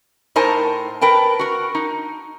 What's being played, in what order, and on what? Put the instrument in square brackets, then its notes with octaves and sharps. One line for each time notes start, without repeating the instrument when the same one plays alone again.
[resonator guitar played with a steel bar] A2 D#4 A#4 C5 G#5 A5
A#4 B4 G5 A5
F#4 A#4
D#4